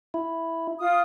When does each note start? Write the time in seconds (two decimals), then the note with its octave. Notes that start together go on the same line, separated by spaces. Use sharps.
0.14 E4
0.79 F4 D#6